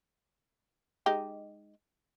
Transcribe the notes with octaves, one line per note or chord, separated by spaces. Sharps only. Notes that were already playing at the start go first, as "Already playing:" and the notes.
G#3 D#4 G4